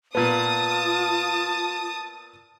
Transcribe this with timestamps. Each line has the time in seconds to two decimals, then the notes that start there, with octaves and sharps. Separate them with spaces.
0.15 A#2 B3 F4 A5 D#6